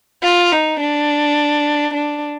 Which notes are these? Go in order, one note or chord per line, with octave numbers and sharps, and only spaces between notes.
F4
D#4
D4
D4